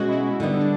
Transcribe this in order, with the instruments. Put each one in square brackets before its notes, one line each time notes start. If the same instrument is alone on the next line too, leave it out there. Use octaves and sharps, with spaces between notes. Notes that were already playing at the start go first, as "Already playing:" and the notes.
Already playing: [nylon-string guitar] B2 G#3 C#4 [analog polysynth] F#4
[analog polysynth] E4
[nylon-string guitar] D3 G3 B3 [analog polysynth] D#4
[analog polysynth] D4